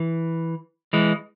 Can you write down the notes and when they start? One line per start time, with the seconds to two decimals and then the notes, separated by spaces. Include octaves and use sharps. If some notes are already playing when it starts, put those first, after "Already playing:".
Already playing: E3
0.93 E3 G#3